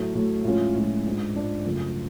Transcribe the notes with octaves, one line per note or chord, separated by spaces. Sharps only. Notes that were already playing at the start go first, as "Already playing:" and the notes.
Already playing: A2 F#3 A3
A2 F#3 A3
A2 F3 G#3 C#4 F4
A2 F3 G#3 C#4 F4
G#2 G#3 D4 F4
G#2 G#3 D4 F4
F#2 C#3 F3 A3